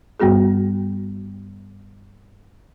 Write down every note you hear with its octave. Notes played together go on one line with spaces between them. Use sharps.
G2 G3 B3 F#4 G#4